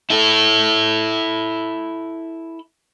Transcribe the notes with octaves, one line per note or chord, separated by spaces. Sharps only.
E4 A4